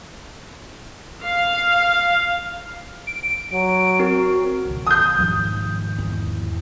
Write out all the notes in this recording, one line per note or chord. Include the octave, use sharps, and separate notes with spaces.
F5
D7
F#3
C4 F#4 A#4
B1 D#3
D#6 G6
D#2 G#2 F3
E2 E4